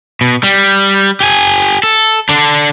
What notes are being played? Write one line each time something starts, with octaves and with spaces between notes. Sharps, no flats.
B2
G3
G4 G#5
A4
D3 D4